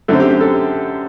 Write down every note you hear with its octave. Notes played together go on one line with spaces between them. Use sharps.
F#2 D3 A3 C4 A4
G4
G4
A4